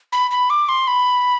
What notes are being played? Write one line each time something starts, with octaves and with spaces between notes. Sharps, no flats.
B5
B5
D6
C6
B5